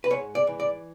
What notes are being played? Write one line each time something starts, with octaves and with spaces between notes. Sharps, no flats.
B4
G#2 C#5
D5
E3
D5